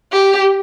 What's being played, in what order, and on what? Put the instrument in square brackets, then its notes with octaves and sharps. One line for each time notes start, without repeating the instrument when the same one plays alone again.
[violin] G4